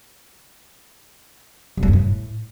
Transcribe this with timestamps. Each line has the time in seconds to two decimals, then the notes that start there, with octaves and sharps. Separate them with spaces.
1.77 F2
1.83 G3
1.88 G2
1.93 A2